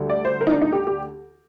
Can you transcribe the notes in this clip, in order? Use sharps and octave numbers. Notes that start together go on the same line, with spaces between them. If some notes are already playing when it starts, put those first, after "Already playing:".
Already playing: D2 D3 G3
D5
C5
A#4
D#4
D4
D#4
G4
G4